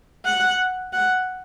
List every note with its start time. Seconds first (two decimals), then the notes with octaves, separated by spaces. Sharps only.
0.25 F#5
0.93 F#5